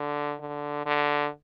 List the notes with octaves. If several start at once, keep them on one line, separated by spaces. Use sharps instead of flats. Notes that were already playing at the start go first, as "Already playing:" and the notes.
Already playing: D3
D3
D3